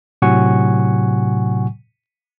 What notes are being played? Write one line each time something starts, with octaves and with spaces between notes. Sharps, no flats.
A2 C3 F#3 F#5 G#5 C#6